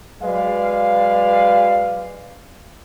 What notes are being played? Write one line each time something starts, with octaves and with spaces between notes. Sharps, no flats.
F#3 G#3 B4 D5 F5